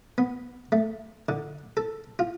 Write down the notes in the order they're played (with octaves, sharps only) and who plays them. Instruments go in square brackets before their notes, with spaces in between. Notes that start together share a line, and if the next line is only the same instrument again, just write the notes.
[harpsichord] B3
A3
D3
A4
F4